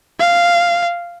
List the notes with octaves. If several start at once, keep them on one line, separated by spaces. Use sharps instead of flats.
F5